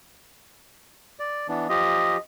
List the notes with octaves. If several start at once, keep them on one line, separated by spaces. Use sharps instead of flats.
D5
E3 B3 D4
F3 F4 G4 D#5